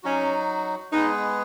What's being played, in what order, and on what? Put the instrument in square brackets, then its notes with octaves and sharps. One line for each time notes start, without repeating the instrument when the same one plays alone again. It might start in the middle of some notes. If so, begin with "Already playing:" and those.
[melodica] F#3 D#4 F#4 [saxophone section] C#4
[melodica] G#3 B3 G#4 B4 [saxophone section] D#4